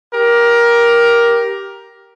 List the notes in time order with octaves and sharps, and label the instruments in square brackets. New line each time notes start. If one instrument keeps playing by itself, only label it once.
[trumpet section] G4 A#4